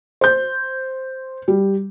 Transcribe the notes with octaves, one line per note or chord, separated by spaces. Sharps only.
C5 G6
G3